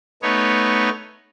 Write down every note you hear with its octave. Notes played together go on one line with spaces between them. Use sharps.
A3 B3 D#4 C#5